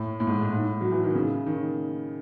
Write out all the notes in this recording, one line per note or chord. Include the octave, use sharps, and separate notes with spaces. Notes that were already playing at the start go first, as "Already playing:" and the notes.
Already playing: A2
A2
G#2
G#2
A2
F#3
E3
D#3
C#3
D#3